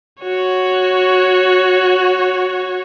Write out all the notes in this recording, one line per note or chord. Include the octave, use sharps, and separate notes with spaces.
F#4 C#5